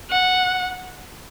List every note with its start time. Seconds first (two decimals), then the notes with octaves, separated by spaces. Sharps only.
0.10 F#5